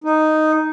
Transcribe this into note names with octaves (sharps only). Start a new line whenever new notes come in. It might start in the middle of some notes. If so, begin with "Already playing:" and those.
D#4